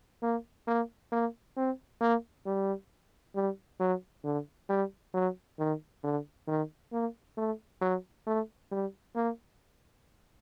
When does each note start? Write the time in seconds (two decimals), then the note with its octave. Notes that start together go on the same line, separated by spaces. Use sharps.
0.23 A#3
0.68 A#3
1.12 A#3
1.57 C4
2.01 A#3
2.46 G3
3.35 G3
3.80 F#3
4.24 D3
4.70 G3
5.14 F#3
5.59 D#3
6.04 D3
6.48 D#3
6.92 A#3
7.38 A3
7.81 F#3
8.27 A3
8.71 G3
9.16 A#3